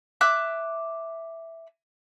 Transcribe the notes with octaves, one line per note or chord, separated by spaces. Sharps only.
E5 D6 F#6